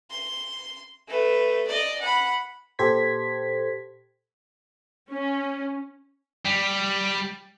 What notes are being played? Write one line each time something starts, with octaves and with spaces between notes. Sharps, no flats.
C6
A3 B4
D5 D#5
F#5 B5
A#2 G4 A4 C5 G#6 B6
C#4
G3